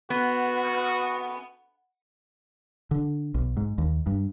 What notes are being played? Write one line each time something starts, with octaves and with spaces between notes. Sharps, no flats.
B3 F#4
D3
B1
G#2
D#2
G2